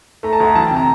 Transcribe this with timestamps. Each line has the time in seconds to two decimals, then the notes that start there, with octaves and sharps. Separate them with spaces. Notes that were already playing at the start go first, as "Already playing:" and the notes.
0.23 A3 A#5
0.33 A5
0.40 D2 A#5
0.55 E3 A5
0.66 G5
0.71 C3
0.77 A#5